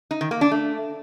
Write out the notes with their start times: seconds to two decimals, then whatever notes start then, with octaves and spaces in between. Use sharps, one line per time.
0.11 D#4
0.21 D#3
0.31 A#3
0.41 D4
0.51 A3